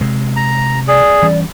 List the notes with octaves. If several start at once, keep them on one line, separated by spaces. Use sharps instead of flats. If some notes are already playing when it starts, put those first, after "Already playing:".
C3 G#3
A#5
G#4 D5
E3 G3 C#4